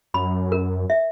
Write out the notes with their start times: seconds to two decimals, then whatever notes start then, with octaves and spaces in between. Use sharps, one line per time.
0.14 F#2 B5
0.52 A#4
0.90 E5